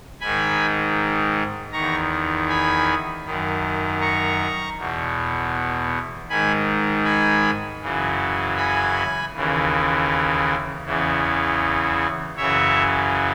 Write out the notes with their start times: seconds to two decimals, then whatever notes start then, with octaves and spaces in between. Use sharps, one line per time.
0.20 G#2 D#3 G#5 B5
1.72 E2 D#3 A#5 C#6
2.49 G#5 B5
3.25 F#2 D#3
4.01 A#5 C#6
4.77 E2 B2
6.29 G#2 D#3 G#5 B5
7.05 G#5 B5
7.82 F#2 C#3 E3
8.57 G#5 B5
9.34 D#2 C#3 E3
10.85 E2 C#3 E3
12.37 F#2 C#3 E3 C#5 E5